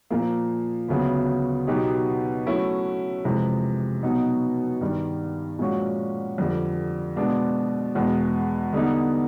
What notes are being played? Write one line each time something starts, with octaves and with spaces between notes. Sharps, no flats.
A#2 F3 A#3
D2 C#3 F#3 B3
B2 F#3 B3 D#4 G4
F#3 A3 C#4 E4
F2 C3 E3 G#3
B2 F#3 B3 D#4
G2 D#3 G3
A#2 F3 G#3 C#4 F#4
F2 D3 G3
B2 G#3 B3 D4
E2 B2 G#3
D3 G3 B3 D#4